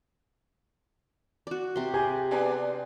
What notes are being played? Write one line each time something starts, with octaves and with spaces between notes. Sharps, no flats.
F#4 D5
C3 C6
G4 G#4 G#5
B3 D4 G#4